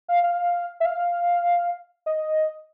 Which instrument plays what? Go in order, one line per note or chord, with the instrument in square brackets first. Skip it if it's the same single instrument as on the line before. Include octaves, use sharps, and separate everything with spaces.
[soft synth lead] F5
F5
E5
F5
D#5